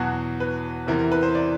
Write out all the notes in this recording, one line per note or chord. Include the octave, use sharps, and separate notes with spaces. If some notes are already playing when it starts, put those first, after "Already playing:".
Already playing: E2 B2 F#3 F#4
B4
E2 C3 E3 A#4
A#4
B4
C5
D5